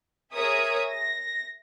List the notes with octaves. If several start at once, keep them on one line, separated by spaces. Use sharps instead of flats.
G#4 A#4 C#5 E5 D#6
A#6